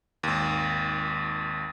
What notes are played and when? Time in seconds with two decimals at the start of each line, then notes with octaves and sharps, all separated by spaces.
0.23 G#1 D#2